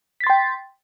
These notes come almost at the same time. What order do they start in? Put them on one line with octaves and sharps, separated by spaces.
B6 A6 C6 G5